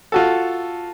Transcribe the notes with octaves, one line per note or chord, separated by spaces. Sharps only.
F4 F#4 A4